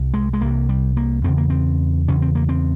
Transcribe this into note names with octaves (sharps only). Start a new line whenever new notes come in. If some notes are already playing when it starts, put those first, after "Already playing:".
Already playing: C2 C3
G#3
G#3
C2 C3 A#3
G3
A#3
E2 C#3 C4
A#3
C4
E2 C#3 C#4
C4
A#3
C4